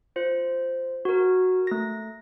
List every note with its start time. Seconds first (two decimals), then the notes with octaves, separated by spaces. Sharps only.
0.16 F4 C5
1.05 F#4 A#4
1.67 A3 A#6